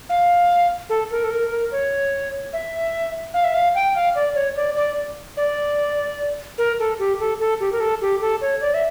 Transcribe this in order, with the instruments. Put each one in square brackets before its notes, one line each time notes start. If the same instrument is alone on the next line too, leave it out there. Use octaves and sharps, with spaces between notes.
[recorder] F5
A4
A#4
A4
A#4
A#4
C#5
E5
F5
E5
F5
G5
F5
D5
C#5
D5
D5
D5
A#4
A4
G4
A4
A4
G4
A#4
A4
G4
A4
C#5
D5
E5